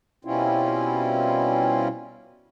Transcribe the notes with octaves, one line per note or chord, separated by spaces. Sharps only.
B2 G3 C4 C#4 E4 F4